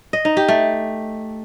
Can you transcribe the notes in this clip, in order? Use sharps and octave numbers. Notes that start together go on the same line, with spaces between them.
D#5
D#4
G4
A3